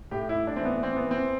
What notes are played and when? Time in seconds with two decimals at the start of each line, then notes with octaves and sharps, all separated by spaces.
0.11 A2 G4
0.29 E4
0.35 A2
0.47 D4
0.56 E3 C4
0.65 B3
0.83 E3 C4
0.97 B3
1.06 E3 C4